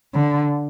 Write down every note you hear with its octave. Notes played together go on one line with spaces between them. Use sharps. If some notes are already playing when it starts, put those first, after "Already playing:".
D3